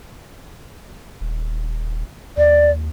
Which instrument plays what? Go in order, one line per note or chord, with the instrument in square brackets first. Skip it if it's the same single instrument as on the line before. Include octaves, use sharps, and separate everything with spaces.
[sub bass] D#1
[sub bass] D#2 [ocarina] D5